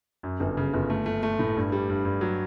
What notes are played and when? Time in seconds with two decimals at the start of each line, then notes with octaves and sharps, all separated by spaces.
0.23 F#2
0.40 G1
0.57 C#3
0.74 G1
0.90 A3
1.06 A3
1.23 A3
1.39 A2
1.56 G2
1.72 G3
1.89 G2
2.05 G2
2.21 F#3